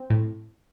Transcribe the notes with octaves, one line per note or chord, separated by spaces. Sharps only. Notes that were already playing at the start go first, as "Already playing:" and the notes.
Already playing: C4
A2